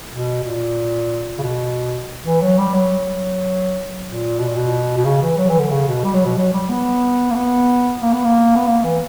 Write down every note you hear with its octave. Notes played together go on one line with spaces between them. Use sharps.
B2
A#2
C#3
B2
E3
F#3
G3
F#3
A#2
B2
A#2
B2
B2
C#3
E3
F#3
E3
D3
C#3
B2
G3
F#3
B2
F#3
G3
B3
A#3
B3
A#3
B3
A#3
B3
A#3
E3